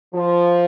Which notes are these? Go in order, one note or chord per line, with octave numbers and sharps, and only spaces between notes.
F3